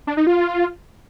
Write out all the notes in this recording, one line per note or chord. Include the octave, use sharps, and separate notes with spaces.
D4
D#4
F4